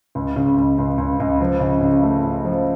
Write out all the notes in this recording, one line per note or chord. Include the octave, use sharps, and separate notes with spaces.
C#2
C#3
C#2
C#2
C#2
C#2
F3
C#3
C#3
A3
C#3
F3